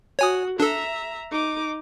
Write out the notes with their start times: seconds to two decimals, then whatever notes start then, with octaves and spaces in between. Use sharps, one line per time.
0.19 F#4 C#5 G#5 D#6
0.60 D4 A4 E5 A#5
1.31 D#4 D6